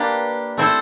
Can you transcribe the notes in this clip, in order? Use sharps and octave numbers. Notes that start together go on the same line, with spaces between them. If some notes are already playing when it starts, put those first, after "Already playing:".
Already playing: A#3 D4 G4 B4
A3 C4 E4 A4 C5